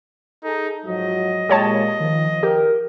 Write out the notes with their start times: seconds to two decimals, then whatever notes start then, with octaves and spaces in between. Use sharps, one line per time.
0.43 D#4 G#4 A4
0.84 G#2 F3 F#3 D#5
1.49 A#2 G#3 G4 C#5 A5
2.00 D#3 F3
2.43 G4 A#4